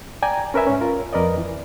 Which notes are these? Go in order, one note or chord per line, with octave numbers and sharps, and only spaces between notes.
D5 G5 G#5 A#5
C#4 A#4 B4 E5 G#5
G#2 C#4
F4 A#4
F2 A#4 B4 D5 D#5
E3